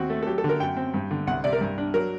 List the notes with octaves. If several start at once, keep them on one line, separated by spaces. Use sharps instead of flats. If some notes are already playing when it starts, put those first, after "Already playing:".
Already playing: D#2 C4 F#4
A3
A4
F#3 G4
A4
D3
A#4
F#2 G5
C4
G2
D3
C2 F#5
C3 D5
A#4
G2
D4
F#3 A#4